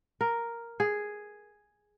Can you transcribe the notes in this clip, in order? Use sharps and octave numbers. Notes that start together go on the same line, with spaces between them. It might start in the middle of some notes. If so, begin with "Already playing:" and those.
A#4
G#4